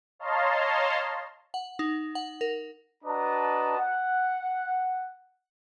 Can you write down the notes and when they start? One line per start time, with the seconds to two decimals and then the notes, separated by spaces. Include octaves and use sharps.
0.19 C#5 D#5 F5 A5 A#5 C6
1.54 F#5
1.79 D#4
2.15 F#5
2.41 A#4
3.04 D4 F#4 B4 D#5 A5 A#5
3.79 F#5